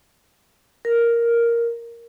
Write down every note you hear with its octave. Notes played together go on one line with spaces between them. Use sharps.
A#4